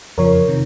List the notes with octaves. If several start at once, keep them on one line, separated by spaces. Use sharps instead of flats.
F2 C#3 F3 A#4 C#5
C3 D#3